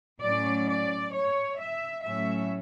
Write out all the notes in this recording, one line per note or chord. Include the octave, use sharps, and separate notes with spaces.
A2 F#3 C#4 D5
D5
C#5
E5
A2 F#3 A3 C#4 E5